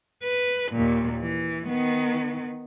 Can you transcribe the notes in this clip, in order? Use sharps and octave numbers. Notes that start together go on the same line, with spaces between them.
B4
D#2 A#2
E3
D#3 B3